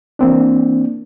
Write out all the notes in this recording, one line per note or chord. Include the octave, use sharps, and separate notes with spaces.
E3 A#3 C4 D4